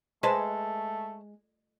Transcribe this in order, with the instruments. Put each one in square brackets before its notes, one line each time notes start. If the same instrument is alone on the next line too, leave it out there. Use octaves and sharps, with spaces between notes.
[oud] G#3 [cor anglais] A3 [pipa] B4 C5 A5